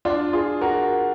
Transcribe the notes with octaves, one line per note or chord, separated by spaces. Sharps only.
D4 F4
F4 G#4
F#4 A#4